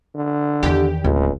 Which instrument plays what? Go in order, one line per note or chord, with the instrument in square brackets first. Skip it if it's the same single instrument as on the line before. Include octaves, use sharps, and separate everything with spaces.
[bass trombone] D3
[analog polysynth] E2 G4 [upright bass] D#3 E3
[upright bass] D1 [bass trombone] C#2